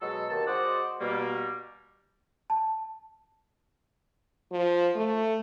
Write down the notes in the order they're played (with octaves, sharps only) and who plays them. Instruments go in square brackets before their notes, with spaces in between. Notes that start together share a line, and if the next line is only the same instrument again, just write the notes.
[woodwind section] B2 F#3 G#3 A4
D#2 A5
G#3 F#4 C5 D5 D#5 F#5
B2 G3 A#3
[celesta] A5
[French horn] F3
A3